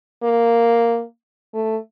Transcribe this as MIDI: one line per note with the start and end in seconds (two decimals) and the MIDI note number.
0.23 1.03 58
1.54 1.77 57